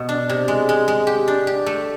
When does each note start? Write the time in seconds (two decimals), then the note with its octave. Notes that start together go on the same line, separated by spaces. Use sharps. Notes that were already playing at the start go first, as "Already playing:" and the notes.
Already playing: B2
0.09 D4
0.29 C3
0.48 G#3
0.69 G#3
0.88 G#3
1.07 G4
1.28 D4
1.47 G4
1.66 A3